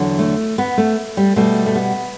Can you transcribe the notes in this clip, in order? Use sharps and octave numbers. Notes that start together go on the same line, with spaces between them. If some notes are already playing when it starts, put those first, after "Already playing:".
Already playing: E2 D3 F#3
A3
B3
A3
G3
B2 G3 A3
A3
B3